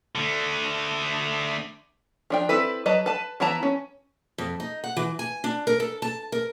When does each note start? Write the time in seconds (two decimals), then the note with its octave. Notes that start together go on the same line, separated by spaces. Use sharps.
0.15 D3 A3
2.30 F3 D4 G5
2.49 C4 E4 A4 B4
2.86 F#3 B4 D#5 A5 A#5
3.06 B4 A5
3.40 E3 B3 E4 A5 A#5
3.63 C#4
4.38 F2
4.60 D#4
4.84 F#5
4.97 E3
5.19 G#5
5.44 D4
5.67 A#4
5.80 A4
6.02 A5
6.32 A#4